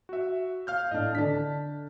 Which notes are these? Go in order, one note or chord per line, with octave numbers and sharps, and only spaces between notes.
F#4 E5
F5 F6 G6
A2 D4 D#5
D3 D4 A5 B6